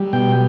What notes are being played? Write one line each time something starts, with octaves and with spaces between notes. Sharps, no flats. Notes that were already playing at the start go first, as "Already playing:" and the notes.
Already playing: G3
B2 G5